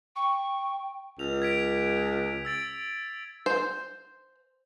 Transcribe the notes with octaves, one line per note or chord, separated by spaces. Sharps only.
G5 C#6
C#2 F7
G#6 B6 D7
E6 A6 D7
C5